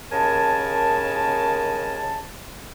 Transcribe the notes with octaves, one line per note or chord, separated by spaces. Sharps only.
D#2 C#3 A#4 G#5 A5